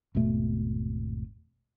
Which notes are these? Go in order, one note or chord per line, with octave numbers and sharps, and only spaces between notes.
G#1 E2 B2 A3